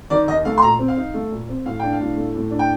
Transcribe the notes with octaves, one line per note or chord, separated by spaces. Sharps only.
D#3 D5
D#2 D#5
A3 F5
C6
A#2 A#5
C4
F5
D#4
A3
A#2
C4
A2 F5
D4 G5
F5
A2
A3
A2
D4
G5